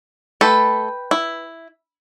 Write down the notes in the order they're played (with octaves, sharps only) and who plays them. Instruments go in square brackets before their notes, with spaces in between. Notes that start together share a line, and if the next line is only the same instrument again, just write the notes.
[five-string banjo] A3 A4 [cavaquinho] B4 G5 B5
[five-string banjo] E4